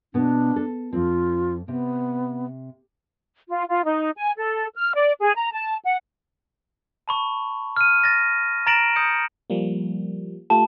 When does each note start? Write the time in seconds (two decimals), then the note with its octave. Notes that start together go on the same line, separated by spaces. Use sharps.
0.14 B2 B3 D4
0.56 A4
0.93 F2 C4 F4
1.68 C3 B3
3.48 F4
3.69 F4
3.85 D#4
4.17 G#5
4.37 A4
4.74 F6
4.95 D5
5.21 G#4
5.36 A#5
5.52 A5
5.84 F#5
7.08 A5 B5 C#6
7.76 F6 D#7
8.04 A6 A#6
8.66 A#5 A6 A#6 D7 E7 F#7
8.96 D#6 G6 C#7
9.50 F3 G3 A#3
10.50 A3 F4 G4 A5